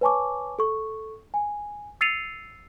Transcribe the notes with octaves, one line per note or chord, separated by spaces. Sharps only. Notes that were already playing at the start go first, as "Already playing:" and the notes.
B4 C#5 G#5 A5 C#6 D6
A4 C#6
G#5
E6 A6 C7 C#7 D#7 F7